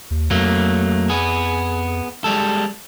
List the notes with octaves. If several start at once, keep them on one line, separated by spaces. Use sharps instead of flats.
D#2
F2 F#3 A3 A#3
B3 G#4
G3 G#3 A4